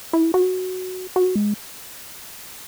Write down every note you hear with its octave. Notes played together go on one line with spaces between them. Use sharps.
E4
F#4
F#4
G#3